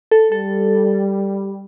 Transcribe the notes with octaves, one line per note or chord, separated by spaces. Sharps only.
A4
G3 A4